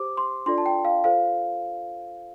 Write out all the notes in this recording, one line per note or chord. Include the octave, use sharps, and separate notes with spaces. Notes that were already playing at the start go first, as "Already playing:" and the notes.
Already playing: G4 C5 D6
C6
D4 F4 A4 D5 C6
A5
G5
F5
F4 A4 C5 F5